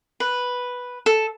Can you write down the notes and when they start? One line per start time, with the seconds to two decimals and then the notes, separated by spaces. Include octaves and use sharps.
0.20 B4
1.06 A4